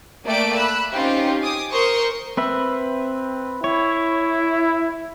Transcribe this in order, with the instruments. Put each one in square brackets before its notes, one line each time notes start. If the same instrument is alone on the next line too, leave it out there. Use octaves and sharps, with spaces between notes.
[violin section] A3 A#3 D5 E5 G5 D7
B5 E6 F#6
C4 C#4 D#4 F4 G4 C5
G#5 D6 D#6
A#4 C5 C6 C#6 D#6
[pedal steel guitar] C4 B4 E5
[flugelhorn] E4 [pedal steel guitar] C#5